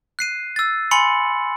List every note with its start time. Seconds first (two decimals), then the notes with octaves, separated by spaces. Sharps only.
0.19 F#6 C7 D#7
0.56 E6 A6
0.91 G#5 B5 C6 C#7 F#7